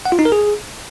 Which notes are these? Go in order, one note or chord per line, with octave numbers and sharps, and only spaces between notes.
F#5
F4
D#4
A#4
G#4